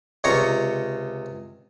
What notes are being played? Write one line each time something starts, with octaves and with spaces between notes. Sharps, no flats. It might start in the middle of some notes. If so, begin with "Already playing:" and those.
C#2 C3 C#5 A#5